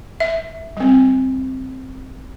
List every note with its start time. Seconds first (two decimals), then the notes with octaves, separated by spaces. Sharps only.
0.20 E5
0.77 G3 C4